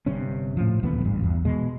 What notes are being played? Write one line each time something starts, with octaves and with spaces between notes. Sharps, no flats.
G1 G2 C3 C#4
A2 F3
D#1 D2 E3 B3
A1 G2
E2
B2 G#3